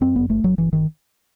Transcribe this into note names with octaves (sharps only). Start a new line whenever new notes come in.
F#2 C4
G1 B3
G1 A3
G1 F#3
G1 E3
G1 D#3